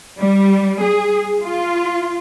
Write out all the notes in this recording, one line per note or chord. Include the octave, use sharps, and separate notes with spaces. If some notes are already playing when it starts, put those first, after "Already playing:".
G3
G#4
F4